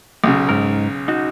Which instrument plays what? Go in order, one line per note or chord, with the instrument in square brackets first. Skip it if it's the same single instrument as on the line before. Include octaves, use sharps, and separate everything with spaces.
[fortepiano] B1 C#3
[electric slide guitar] G#2 A#4
D#4 F#4